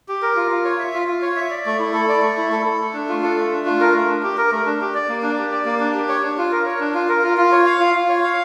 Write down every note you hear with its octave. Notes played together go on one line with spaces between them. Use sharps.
G4
A#4
F4
F4
C#5
E5
F4
F4
C#5
E5
D5
A3
E4
A4
D5
A3
E4
A4
A4
A3
D4
F4
A4
A3
D4
F4
A#4
A3
D4
G4
A#4
A3
D4
G4
D5
A#3
D4
G4
D5
A#3
D4
G4
C#5
D4
F4
A#4
C#5
D4
F4
A#4
F4
F4
C#5
F5
F4
F4
C#5
F5